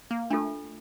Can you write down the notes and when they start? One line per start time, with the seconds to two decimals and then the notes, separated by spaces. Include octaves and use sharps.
0.11 A#3
0.30 A3 D4 F4 A4